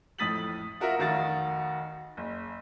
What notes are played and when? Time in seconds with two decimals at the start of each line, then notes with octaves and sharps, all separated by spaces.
0.18 F2 A2 D#6 A6 B6 F#7
0.80 F4 F#4 A#4 E5
0.98 F1 D#3 F#4 F5 A6
2.17 F#1